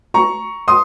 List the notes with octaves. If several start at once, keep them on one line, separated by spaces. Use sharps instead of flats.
A#5 C#6
C6 D#6